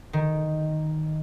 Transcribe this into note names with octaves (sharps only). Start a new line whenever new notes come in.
D#3